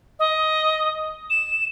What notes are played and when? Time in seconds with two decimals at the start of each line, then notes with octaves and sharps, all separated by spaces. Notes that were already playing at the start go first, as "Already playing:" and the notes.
0.19 D#5
1.30 E7